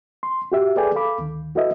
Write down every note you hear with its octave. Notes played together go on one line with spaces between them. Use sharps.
C6
F#4 G4 E5
G#4 A4 B4 D5 G5 G#5
A4 F5 B5 D6
D2 D#3
E4 F#4 A4 B4 D#5 E5